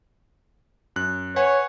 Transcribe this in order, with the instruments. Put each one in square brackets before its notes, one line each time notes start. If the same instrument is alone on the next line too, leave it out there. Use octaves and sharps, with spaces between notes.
[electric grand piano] F#2 F#6
[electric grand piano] B4 F#5 G#5 [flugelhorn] C#5